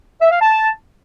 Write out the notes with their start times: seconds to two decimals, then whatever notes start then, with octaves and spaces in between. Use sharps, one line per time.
0.21 E5
0.31 F5
0.41 A5